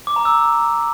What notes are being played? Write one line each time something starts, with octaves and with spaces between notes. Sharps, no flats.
D6
A#5
E6